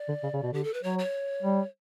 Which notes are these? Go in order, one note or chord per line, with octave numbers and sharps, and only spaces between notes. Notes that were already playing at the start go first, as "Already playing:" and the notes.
Already playing: D5
D3
C#3
C#3
B2
D3 G4
A4
B4
F#3 C#5
C#5
G3